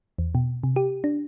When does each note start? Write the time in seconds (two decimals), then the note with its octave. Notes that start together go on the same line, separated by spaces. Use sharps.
0.18 E2
0.35 B2
0.63 C3
0.76 G4
1.04 D4